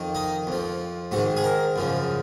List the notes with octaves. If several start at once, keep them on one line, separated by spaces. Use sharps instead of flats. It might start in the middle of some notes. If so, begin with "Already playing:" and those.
Already playing: F2 D#3
D#4
F2 F3
G#2 D#3 F#4
G#4
A#4
F#2 C#3 F3